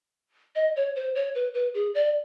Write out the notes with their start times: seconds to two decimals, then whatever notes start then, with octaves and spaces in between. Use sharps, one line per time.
0.55 D#5
0.76 C#5
0.96 C5
1.15 C#5
1.35 B4
1.54 B4
1.74 G#4
1.95 D5